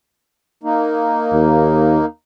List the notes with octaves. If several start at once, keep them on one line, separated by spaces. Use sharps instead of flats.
A#3 D#4
D#2